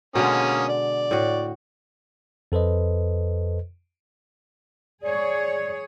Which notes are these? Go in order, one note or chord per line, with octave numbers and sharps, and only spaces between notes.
B2 D3 G#3 A#3 C#4 D#6
D5
A2 F#4
F2 A4 B4 C5 D#5
G#4 C#5 D5